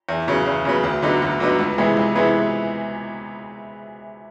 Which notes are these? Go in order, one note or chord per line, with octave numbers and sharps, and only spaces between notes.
E2
C#3 F#3 B3
E2
C#3 F#3 B3
D2
D3 F#3 B3 D#4
D2
D3 F#3 B3 D#4
C#2
C3 E3 G#3 B3
C#2
C3 E3 G#3 B3